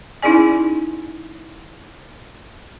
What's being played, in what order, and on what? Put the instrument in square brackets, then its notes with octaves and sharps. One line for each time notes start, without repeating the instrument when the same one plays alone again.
[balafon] C#4 D#4 E4 G#4 D5 G#5